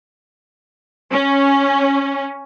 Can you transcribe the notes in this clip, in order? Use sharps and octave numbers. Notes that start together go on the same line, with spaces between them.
C#4